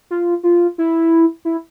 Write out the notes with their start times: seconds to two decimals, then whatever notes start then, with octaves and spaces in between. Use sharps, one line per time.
0.11 F4
0.43 F4
0.78 E4
1.45 E4